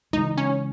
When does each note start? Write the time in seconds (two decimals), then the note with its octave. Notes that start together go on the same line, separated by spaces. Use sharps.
0.13 C#3 E3 G#3 D#4
0.38 C#4